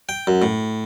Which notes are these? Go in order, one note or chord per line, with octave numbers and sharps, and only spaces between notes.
G5
F#2
A2